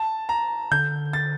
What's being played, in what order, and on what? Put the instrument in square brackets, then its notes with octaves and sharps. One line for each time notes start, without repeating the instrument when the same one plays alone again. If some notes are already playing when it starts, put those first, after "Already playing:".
Already playing: [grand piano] A5
A#5
[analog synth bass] D3 [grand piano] G6
[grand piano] A6